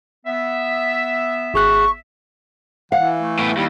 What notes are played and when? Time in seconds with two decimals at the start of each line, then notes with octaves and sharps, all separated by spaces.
0.26 B3 E5
1.54 G#1 G#4 C#6 F#6
2.92 E3 F5 F#5
3.19 A3
3.39 A2 B3
3.57 D#2 G3 E4